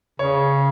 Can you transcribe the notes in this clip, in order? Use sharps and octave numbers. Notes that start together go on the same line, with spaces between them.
C#3 C#5